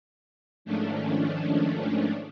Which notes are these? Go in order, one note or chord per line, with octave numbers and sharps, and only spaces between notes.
G#2 D#3 F3 A3 C#4 D4